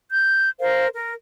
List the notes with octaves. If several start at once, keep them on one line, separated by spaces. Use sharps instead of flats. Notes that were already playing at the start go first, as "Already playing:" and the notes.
G6
A#4 C5 F5
A#4